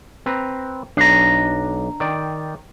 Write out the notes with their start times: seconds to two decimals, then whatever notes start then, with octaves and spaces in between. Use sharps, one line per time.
0.26 C4 B4 A#5
0.97 B1 D4 A#5
2.00 D#3 D5 G5